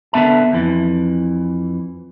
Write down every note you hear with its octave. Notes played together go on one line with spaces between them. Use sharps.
D3 B3 E5 A5
F2 E3